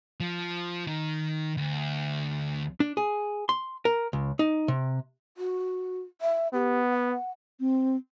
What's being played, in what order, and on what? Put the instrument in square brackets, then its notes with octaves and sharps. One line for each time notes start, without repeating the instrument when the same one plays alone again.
[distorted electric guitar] F3
D#3
D2
[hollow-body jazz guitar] D4
G#4
C6
A#4
C#2
D#4
C3
[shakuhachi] F#4
E5
[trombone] B3 [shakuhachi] G4
[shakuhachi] F#5
[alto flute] C4